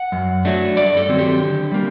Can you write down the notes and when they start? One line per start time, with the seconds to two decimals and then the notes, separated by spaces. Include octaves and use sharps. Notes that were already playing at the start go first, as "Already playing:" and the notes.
Already playing: F#5
0.12 F#2
0.45 F#3 A3 D4
0.76 G2 D5
0.97 A4
1.09 D#3 F#3 C4
1.19 G4
1.39 D3
1.72 G3 A#3